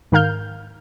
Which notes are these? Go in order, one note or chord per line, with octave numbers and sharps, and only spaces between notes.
G#2 D#3 A#4 F5 F6 G6